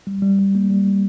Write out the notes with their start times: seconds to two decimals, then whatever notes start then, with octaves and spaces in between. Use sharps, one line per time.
0.07 G3
0.22 G3
0.39 G3
0.55 A#3
0.70 G3